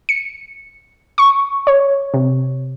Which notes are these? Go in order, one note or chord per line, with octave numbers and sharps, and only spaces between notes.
C#7
C#6
C#5
C3